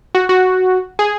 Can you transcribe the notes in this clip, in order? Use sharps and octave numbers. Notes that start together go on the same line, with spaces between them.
F#4
F#4
G#4